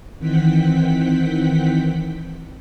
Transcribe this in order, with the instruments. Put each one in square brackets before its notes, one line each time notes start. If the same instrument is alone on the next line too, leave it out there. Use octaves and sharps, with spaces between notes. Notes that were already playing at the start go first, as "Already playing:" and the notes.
[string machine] D#3 E3 C4 F#5 G5 B6